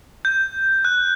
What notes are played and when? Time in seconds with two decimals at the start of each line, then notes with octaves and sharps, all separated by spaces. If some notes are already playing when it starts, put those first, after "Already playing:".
0.25 G6
0.85 F#6